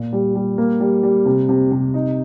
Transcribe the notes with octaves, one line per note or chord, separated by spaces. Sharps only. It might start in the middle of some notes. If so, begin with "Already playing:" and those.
Already playing: A#2
G3
G3
A#3
G3
G3
C3
C3
C3
D#4